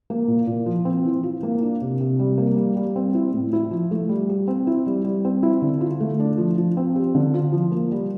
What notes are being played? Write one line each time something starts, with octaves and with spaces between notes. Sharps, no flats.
A#3
A#2
A#2
F3
C4
E3
F4
A#3
D4
C3
C3
G3
A#3
G3
G3
C4
E4
A2
E4
F3
A3
G3
G4
C4
E4
G3
G3
C4
E4
D3
F4
A3
D4
F3
F3
C4
G4
D3
F4
F3
A#3
G3